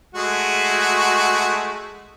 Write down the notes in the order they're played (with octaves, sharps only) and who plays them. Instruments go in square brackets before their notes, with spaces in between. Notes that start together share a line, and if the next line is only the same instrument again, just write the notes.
[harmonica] G#3 A3 F#4